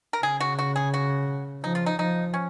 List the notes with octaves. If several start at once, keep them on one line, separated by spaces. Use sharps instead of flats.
A#4
C#3 G#4
F#4
F#4
G#4
F#4
F3 D#4
F4
D#4
F3 D#4
C#4